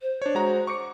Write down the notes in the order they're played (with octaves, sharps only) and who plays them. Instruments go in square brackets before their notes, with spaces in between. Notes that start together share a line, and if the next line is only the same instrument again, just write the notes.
[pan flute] C5
[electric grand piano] D4 C#5
G#3 F#4 A#5
C#6 D6 C#7